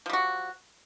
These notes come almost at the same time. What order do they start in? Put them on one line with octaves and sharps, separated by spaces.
F3 G3 F#4